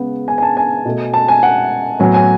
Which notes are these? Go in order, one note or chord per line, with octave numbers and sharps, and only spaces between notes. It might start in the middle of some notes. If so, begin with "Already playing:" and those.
Already playing: C#3 G#3 B3
G#5
G#5
A5
G#5
B2 A3
A5
G#5
F#5
A2 F#3 B3 G#5
G#5